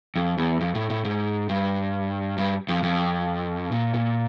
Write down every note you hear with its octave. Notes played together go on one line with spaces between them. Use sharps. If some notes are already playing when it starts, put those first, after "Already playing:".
F2
E2
F2
A2
A2
G#2
G2
G2
F2
F2
A#2
A#2